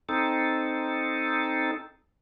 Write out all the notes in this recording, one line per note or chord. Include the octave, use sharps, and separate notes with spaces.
C4 D#4 A4